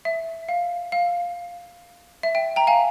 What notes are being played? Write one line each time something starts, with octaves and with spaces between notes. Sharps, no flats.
E5
F5
F5
E5
E5 G5
G5 A#5
F5 G#5